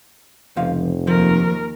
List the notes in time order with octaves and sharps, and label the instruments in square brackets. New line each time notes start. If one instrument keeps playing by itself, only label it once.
[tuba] F1 [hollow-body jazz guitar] C#2 F3 F5
[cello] D#2 A#4 [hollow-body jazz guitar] F3